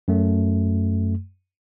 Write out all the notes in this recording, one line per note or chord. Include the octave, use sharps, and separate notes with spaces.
F#2 A3